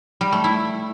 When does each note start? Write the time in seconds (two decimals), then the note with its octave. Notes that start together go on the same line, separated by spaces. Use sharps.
0.21 G3
0.32 A3
0.44 E4